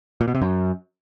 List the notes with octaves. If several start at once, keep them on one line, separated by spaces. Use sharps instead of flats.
A#2
B2
C3
F#2